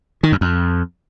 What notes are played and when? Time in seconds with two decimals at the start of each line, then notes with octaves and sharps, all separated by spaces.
0.23 D#3
0.32 F#2
0.41 F2